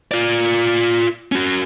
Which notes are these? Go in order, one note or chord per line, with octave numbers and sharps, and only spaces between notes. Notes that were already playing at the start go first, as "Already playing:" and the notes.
F4 D5
C#4 F#4